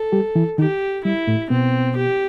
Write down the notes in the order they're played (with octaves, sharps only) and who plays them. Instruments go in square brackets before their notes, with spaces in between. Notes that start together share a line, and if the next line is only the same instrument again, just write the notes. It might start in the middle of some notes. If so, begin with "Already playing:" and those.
Already playing: [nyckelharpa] A4
[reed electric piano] G3 G4
E3 E4
[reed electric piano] D#3 D#4 [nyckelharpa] G4
[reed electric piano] G3 [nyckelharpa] E4
[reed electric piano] A2 A3
[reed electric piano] B2 B3 [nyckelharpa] C4
[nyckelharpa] G4